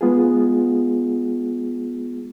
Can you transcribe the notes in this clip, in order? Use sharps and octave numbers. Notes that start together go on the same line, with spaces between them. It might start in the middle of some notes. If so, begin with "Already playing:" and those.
G#3 B3 F4 G#4